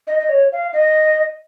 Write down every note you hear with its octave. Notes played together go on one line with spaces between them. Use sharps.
D#5
D#5
C#5
F5
D#5